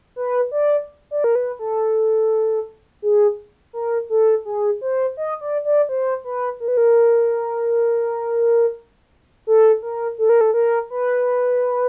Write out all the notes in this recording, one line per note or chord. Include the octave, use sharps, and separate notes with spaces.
B4
D5
D5
A#4
B4
A4
G#4
A#4
A4
G#4
C5
D#5
D5
D5
C5
B4
A#4
B4
A#4
A4
A#4
A4
A#4
A4
A#4
B4